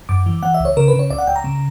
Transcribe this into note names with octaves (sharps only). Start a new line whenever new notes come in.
F#2 D6
E3
E3 F#5
E5
C#2
C#5
C#3 A#4
B4
C#3
C#5
C#2 D5
F#5
C#2 G5
A#5
C#3